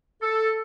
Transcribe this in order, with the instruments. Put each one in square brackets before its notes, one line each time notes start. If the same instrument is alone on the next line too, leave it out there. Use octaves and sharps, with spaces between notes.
[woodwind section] A4